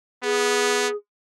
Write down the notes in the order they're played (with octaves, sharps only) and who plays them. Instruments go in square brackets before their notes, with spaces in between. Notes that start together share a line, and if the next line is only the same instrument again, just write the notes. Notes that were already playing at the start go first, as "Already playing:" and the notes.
[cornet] B3 [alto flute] G#4